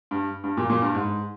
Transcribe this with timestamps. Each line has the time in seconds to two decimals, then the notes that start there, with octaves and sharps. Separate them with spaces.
0.11 G2
0.44 G2
0.57 A#2
0.70 A#2
0.82 G2
0.94 G#2